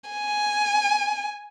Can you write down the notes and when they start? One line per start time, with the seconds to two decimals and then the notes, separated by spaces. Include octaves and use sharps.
0.10 G#5